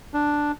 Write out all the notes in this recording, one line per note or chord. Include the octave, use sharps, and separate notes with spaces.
D4